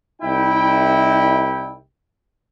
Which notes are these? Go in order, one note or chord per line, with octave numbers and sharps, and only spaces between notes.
C2 D#4 E4 G5